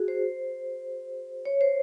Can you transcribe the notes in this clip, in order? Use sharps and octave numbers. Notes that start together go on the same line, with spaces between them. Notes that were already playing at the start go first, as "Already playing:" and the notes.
Already playing: F#4 G#4
C5
C#5
C5